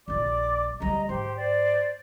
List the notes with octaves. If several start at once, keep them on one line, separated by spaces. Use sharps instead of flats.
D#1 A#1 D5 D6
D2 G3 D#5 A#5
G#2 G4 C5 C6
C5 D5